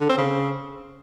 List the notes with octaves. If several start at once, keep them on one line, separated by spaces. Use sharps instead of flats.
D3
C4
C#3